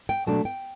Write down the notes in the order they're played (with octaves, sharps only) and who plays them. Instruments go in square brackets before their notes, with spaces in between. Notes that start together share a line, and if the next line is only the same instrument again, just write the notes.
[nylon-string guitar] G5
B2 F#3 A3 D4 A5
G5